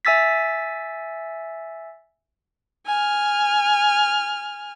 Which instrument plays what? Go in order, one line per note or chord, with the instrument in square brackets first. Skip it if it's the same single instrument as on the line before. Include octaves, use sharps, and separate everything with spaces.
[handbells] E5 G#5 E6 A6 B6
[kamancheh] G#5 F6